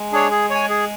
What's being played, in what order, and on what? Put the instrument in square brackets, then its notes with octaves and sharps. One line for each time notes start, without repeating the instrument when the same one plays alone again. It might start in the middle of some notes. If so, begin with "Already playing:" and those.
Already playing: [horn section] G#3
[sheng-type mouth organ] D4 G#4 C#5
G#4
C#5 G#5
G#4